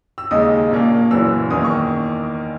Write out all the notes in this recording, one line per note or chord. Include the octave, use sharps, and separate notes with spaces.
E6
D#2 C#3 G#3 D#4 D#6
A#1 A#2 A#3 C#4
F#1 F#2 E3 B3 E6
E2 D#3 A#3 C#4 D#6
C#6